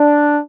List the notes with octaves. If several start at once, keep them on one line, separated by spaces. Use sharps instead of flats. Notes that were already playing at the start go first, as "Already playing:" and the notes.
Already playing: D4